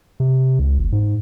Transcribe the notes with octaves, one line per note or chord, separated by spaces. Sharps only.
C3
C#2
F#1
G#2